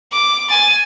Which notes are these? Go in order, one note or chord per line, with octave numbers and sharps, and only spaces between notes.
D6
G#5 A6